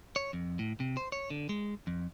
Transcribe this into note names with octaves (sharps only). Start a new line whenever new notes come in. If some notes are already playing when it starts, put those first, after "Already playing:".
C#5
F2
A2
C3
C5
C#5
D3
G#3
F2